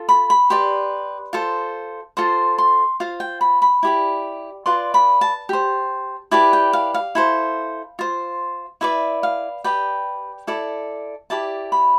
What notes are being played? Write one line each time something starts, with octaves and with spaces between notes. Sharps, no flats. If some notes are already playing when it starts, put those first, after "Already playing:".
Already playing: F4 A4
B5
B5
G4 B4 D5 C6
F4 A4 C5
F4 A4 C5 C6
C6
F4 C5 F5
G5
B5
B5
E4 G4 D5
F4 B4 D5 C6
B5
A5
G4 C5
E4 G4 B4 D5 A5
G5
F5
F5
E4 A4 C5
F4 C5
E4 B4 D5 E5
F5
G4 B4 D5 G5
E4 A4 D5
E4 G4 D5 A5
B5